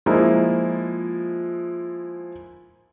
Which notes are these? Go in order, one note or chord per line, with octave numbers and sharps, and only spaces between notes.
F3 G#3 A#3 D#4 E4